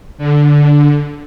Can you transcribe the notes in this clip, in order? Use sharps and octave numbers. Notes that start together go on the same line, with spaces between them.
D3